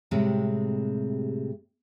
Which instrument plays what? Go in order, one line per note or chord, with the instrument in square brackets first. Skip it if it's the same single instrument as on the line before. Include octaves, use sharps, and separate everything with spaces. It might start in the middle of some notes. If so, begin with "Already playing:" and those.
[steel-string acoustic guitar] A2 C3 G3 G#3 C4